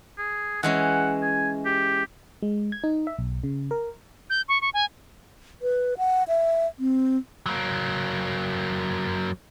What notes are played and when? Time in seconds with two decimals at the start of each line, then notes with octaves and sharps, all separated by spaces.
0.18 G#4
0.63 E3 G#3 C#4 F#5
1.23 G#5
1.66 G4
2.42 G#3
2.72 G#6
2.84 D#4
3.07 E5
3.19 B1
3.44 C#3
3.71 A#4
4.30 G6
4.48 C#6
4.62 C#6
4.74 G#5
5.62 B4
5.98 F#5
6.28 E5
6.79 C4
7.46 F#3 A#3